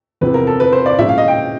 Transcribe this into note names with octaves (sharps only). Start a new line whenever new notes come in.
E2 C3 F3 B4
A#4
A4
B4
C5
D5
A#2 F3 G#3 C#4 E5
F5
D#5
G5